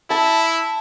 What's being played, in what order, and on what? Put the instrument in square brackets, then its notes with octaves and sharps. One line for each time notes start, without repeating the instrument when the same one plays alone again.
[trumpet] E4 [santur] A5